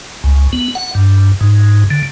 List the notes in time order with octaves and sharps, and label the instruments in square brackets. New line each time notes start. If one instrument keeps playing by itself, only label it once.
[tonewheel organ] C#2
B3
F#5
G2
G#2
D3